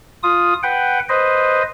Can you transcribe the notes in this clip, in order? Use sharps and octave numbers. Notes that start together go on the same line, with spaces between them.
F4 D#6
B4 F#5 G5
B4 C5 D#5